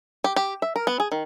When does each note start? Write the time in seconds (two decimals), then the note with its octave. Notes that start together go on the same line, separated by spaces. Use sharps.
0.24 G4
0.36 G4
0.62 E5
0.76 A#4
0.87 B3
1.00 G#4
1.12 D#3